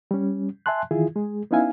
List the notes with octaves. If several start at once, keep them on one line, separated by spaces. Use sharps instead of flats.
G3 C#4
E5 G#5 A5 C6 F#6
D#3 E3 E4 F4 G#4
G#3 G#4
B3 C#4 D#4 E4 F5 G#5